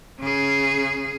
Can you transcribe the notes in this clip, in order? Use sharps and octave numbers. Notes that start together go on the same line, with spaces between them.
C#3 G#4